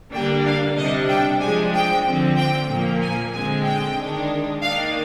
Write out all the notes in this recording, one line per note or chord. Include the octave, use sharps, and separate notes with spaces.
D3 G3 A#3 D4 G5
F5
C3 G3 D4 D#5
G5
F3 G#3 D4 G#5
G5
D3 F3 C4
G5
A#2 F3 A#3
G#5
D3 G#3 C4 G#5
G5
D#3 G#3 D4
D#3 A#3 D4 F5